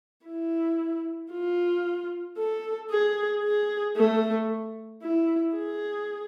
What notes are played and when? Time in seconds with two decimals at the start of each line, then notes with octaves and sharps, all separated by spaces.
0.26 E4
1.32 F4
2.38 A4
2.90 G#4
3.44 G#4
3.96 A3
5.02 E4
5.54 G#4